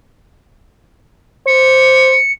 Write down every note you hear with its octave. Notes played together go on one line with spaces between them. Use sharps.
C5 C#7